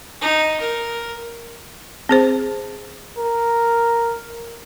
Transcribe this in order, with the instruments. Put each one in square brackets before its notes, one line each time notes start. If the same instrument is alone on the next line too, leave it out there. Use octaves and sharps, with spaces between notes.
[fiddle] D#4
A#4
[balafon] C4 G#4 C5
[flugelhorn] A#4